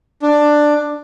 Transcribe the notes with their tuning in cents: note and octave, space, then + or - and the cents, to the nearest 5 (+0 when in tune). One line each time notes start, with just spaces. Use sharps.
D4 +10